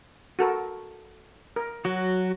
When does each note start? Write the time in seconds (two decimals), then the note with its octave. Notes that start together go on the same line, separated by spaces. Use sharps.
0.39 F#4 A4 A#4
1.56 A#4
1.85 F#3 F#4